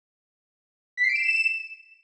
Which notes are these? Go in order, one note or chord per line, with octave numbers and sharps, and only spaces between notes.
B6
C7
D7
E7